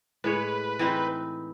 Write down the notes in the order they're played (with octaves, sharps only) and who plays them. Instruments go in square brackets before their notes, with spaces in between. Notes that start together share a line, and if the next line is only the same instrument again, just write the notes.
[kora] A2 G#3 C#5 [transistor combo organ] B4
[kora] E3 C4 D#4